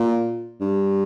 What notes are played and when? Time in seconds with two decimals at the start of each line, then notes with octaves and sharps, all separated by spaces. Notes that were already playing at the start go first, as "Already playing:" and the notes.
Already playing: A#2
0.61 G2